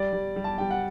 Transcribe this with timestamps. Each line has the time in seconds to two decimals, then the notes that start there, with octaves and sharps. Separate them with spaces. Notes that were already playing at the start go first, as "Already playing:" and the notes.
Already playing: G3 D5
0.13 G3
0.36 G3
0.44 A5
0.58 G3 G5
0.71 F#5